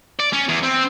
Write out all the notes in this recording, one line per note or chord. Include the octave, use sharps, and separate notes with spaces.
D5
C#4
E2
C4